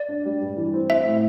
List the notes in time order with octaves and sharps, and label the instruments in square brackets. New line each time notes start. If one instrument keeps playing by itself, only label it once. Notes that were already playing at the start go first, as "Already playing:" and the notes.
Already playing: [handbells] D5
[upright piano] D4
G3
G2
E3
C4
[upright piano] C4 [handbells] E5
[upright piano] A2